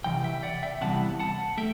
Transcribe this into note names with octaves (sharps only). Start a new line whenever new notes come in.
C3 E3 G5
E5 G5
D5 F#5
E5 G5
C3 E3 G3 B3 F#5 A5
F#5 A5
A3 E5 G5